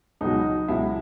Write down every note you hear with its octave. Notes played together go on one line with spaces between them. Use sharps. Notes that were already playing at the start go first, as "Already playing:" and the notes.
C#2 B2 F#3 D#4
C#2 B2 F#3 E4